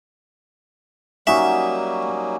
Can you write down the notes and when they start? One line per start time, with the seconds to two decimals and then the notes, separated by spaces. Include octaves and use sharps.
1.27 F#3 G3 A#3 C#4 D#4 F#4 E5